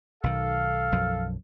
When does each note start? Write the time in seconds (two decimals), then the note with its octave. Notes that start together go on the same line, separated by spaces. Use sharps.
0.24 B1 D#3 A4 F5
0.92 B1 F#2 F3